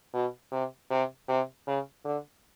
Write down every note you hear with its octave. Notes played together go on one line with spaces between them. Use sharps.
B2
C3
C3
C3
C#3
D3